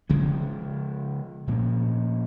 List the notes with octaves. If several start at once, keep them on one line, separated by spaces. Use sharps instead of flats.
C#3 F3 G#3 B3
A#2 F3 A#3 C#4